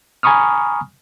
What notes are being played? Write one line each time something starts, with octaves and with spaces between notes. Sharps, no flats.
G#5 A#5 B5 C#6 D#6 F6